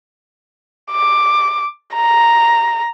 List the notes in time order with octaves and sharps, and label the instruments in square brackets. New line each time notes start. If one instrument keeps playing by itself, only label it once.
[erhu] D6
A#5